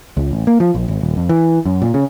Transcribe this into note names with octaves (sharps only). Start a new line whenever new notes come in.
C#2
A1
A#3
F3
A#1
G#1
D#1
F2
E3
F#2
A#2
C#3